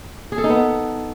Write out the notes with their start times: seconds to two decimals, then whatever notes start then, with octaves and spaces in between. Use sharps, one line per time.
0.32 G#4
0.38 A4
0.44 D#4
0.50 B3